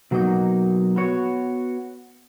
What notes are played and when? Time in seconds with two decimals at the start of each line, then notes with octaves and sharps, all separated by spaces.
0.11 B2 F#3 A#3 D#4 F#4
0.96 B3 F#4 C#5